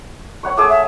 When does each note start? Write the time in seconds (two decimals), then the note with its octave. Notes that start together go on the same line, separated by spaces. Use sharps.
0.43 C#5 F#5 C#6
0.57 A3 G#4 D6
0.70 E5